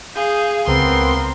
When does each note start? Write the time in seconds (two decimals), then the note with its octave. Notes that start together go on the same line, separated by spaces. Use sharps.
0.15 G#4 F5 G6
0.67 C#2 B3 C4 A#4 C6